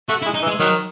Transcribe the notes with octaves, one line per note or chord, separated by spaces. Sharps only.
A3 F#4
E4
G#3
D#4
E3
G#3
D#3 F#3